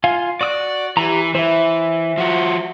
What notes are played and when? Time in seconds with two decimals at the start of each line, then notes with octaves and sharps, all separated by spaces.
0.04 F4 F5 G#5
0.41 F#4 D5 D#6 F#6
0.97 E3 G4 A#5
1.35 E3 C5 E5
2.18 F3 F#4